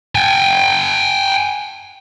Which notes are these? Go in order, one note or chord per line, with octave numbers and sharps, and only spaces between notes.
G5 G#5